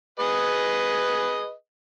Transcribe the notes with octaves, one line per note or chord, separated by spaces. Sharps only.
G#4 B4 D#5